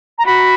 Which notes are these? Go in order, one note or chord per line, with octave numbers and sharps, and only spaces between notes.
A#5
F#4 B5